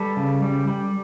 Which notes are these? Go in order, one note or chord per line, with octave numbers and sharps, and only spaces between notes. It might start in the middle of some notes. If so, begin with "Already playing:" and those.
Already playing: G3 A4 B4
C#3
G3
G3